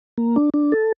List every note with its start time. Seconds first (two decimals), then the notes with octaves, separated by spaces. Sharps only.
0.18 A#3
0.36 D4
0.54 D4
0.72 A4